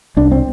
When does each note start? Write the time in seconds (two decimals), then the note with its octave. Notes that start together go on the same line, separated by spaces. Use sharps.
0.17 C2 D4
0.31 C4